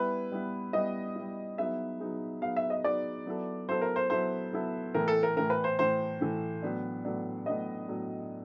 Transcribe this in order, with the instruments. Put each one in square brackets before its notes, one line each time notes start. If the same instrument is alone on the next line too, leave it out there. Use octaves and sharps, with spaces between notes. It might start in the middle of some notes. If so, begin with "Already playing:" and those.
Already playing: [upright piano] G3 B3 E4 [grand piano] B4
[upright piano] G3 B3 E4
[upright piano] G3 B3 E4 [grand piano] D#5
[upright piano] G3 B3 E4
[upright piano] F#3 B3 D#4 G#4 [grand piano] E5
[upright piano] F#3 B3 D#4 G#4
[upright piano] F#3 B3 D#4 G#4 [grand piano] F5
[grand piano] E5
D#5
[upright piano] F#3 B3 D#4 G#4 [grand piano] D5
[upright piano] F#3 B3 E4 A4
[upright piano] F#3 B3 E4 A4 [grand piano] C5
[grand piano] A#4
C5
[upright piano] F#3 B3 E4 A4 [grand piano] C5
[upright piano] F#3 B3 E4 A4
[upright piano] A2 E3 A3 [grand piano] A#4
[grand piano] A4
A#4
[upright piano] A2 E3 A3 [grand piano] A#4
[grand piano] B4
C5
[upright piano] A2 E3 A3 [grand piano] C5
[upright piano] A2 E3 A3
A2 F#3 B3 D4
A2 F#3 B3 D4
[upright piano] A2 F#3 B3 D4 [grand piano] D#5
[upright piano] A2 F#3 B3 D4